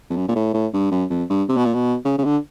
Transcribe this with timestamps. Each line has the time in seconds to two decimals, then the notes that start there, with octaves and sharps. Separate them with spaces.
0.10 F2
0.16 F#2
0.28 A#2
0.35 A2
0.54 A2
0.73 G2
0.91 F#2
1.10 F2
1.30 G2
1.49 C3
1.57 B2
1.65 A#2
1.74 B2
2.05 C#3
2.18 C#3
2.24 D3